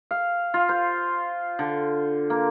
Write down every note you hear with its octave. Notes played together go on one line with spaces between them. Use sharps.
F5
F4
C5
D3
A#3